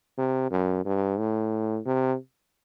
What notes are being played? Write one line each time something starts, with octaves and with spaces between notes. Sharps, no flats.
C3
F#2
G2
A2
C3